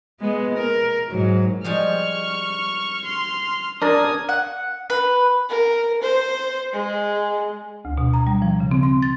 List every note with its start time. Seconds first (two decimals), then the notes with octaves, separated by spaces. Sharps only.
0.21 G#3 B3
0.55 A#4
1.10 G#2 F#3
1.64 F3 G3 G#3 C#6 F6
3.05 C6 F6
3.82 D4 A#4 D5 G#5 D#6
4.29 F#5
4.90 B4
5.49 A#4
6.02 C5
6.73 G#3
7.85 D2
7.98 B2
8.14 A#5
8.27 G3
8.42 F3
8.60 C#3
8.71 C4
8.83 C6
9.02 A6